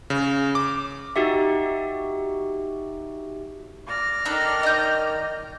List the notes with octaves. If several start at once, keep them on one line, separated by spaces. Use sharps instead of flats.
C#3
D6
D#4 F#4 G4 E5
D5 F6 A#6
D#3 D4 D#4 A4
D#5 G6